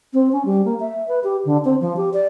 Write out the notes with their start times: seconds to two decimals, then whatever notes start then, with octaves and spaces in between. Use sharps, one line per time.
0.13 C4
0.32 C#4
0.45 G3
0.65 A#3
0.80 E5
1.08 B4
1.24 G4
1.45 D3
1.65 C4
1.81 F3
1.97 G4
2.13 D5